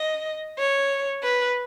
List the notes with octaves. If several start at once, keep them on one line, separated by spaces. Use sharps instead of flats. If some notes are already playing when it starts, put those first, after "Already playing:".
Already playing: D#5
C#5
B4